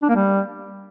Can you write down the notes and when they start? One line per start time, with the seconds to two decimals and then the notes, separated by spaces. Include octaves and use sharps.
0.02 D4
0.09 A#3
0.16 G3